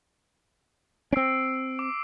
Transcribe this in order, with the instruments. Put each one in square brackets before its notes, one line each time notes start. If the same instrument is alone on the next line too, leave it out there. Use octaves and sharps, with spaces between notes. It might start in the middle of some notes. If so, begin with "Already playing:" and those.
[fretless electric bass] C4 C#4 [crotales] E6 C7 D7
[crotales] D6